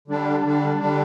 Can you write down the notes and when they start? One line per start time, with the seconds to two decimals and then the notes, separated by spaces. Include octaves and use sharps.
0.08 D3 G3 D4
0.44 D3 G3 D4
0.80 D3 G3 D4